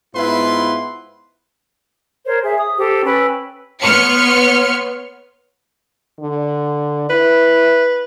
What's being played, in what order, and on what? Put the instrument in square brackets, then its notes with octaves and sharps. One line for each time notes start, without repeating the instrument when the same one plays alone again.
[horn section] G#2 B3 E4 F4 B4 C6
[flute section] A#4 C5 C#5
G#4 E5
D#6
G4 A4 C5
C#4 B4 G5 E6
[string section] B3 C#5 C6 F6 C#7
[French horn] D3
[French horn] E4 [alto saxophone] B4